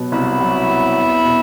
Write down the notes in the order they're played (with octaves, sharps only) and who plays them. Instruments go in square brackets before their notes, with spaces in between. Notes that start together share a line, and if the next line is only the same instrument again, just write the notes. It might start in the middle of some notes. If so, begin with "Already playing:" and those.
Already playing: [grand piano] B2 F#3 B3
[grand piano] C2 [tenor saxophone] E4
[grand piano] F#3
B3
B3
B2